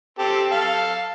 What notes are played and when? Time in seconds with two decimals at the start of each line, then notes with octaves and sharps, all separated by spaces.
0.19 C4 G4 A4
0.51 A4 F5